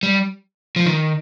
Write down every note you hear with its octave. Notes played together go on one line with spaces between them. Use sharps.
G3
F3
D#3